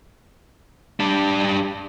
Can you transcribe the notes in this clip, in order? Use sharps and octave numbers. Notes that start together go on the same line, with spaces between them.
G3 D4